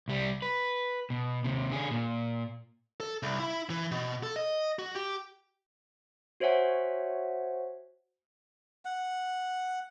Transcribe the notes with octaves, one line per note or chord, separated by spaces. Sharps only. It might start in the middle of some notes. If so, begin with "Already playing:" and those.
C2 G3
B4
B2
D#2 C3
D3 G#4
A#2
A4
C2
E4
E3
B2
A4
D#5
F#4
G4
F#4 C5 C#5 E5 F#5 G#5
F#5